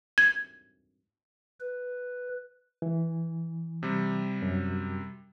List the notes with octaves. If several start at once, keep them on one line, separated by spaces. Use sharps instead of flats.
G#6
B4
E3
C3 G3
F#2